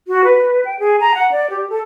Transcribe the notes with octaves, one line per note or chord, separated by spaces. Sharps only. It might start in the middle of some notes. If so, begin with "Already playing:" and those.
F#4
B4
G5
G#4
A#5
F#5
D5
G4
A4